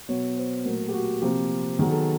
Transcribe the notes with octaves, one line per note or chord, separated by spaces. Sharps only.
B2 F#3 B3 C#5
C5
A#2 F#3 A3 A#4
G4
F#4
C3 F3 A#3 G4
D#3 F#3 B3 G#4
A4